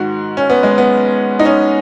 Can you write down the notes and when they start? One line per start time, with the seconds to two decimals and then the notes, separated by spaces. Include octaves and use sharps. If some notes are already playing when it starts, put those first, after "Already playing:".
Already playing: G#2 D#3 F#4
0.37 C#4
0.50 B3
0.63 G#3
0.78 B3
1.39 D#4
1.45 C#4